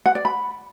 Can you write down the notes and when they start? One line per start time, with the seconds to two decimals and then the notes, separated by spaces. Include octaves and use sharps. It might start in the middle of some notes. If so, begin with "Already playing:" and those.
0.06 F#5
0.15 D5
0.25 B5